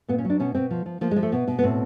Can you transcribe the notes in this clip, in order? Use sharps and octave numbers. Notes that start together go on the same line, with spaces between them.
A#2 B3
C#4
F#3
D4
B2 C#4
B2 C4
F3
F3
F3 A#3
G#3
F3
A3
B2 B3
B2
B3
A2 C4